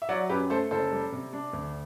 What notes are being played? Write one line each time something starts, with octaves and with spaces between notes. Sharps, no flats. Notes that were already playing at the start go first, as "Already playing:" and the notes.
E5
F#3 D5 F#5
F#2 G4 B4
A3 A4 C5
F#1 A4 C5
G3
C3
D4
D2